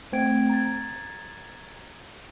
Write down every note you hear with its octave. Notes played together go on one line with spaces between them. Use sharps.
A3 C4 C5 G5 G#6 D7
A#5 G#6 A6